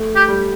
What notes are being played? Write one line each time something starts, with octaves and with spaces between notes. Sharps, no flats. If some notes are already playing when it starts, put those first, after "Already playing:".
Already playing: A3
G4
G3